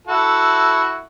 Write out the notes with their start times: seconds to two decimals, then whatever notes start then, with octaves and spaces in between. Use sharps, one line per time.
0.08 E4 F#4 A4